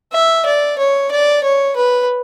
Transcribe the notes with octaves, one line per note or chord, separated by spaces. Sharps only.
E5
D5
C#5
D5
C#5
B4